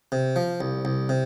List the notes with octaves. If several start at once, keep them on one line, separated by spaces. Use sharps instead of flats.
C3
F3
C2
C2
C3